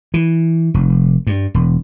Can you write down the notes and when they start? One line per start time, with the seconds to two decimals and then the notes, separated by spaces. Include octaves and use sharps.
0.14 E3
0.74 F1
1.27 G2
1.54 E1